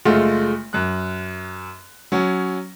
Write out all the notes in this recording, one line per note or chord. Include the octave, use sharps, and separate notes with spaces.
F#1 G#3 A3 F4
F#2 F#6
F#3 C#4